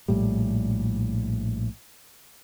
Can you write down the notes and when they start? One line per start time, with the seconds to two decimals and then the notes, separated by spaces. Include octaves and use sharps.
0.08 A#1 A2 G3